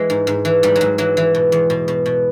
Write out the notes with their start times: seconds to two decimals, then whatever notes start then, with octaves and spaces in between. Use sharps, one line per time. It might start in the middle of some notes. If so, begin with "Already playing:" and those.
Already playing: E3 G#3
0.10 G#2
0.27 G#2
0.45 E3
0.63 G#2 G3
0.76 F#3
0.81 G#2
0.98 E3 F#3
1.17 E3
1.35 B2
1.52 E2
1.70 B2
1.88 B2
2.06 B2